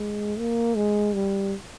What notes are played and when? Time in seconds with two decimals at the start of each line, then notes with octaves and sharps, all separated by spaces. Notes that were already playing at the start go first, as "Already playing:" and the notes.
Already playing: G#3
0.39 A#3
0.76 G#3
1.15 G3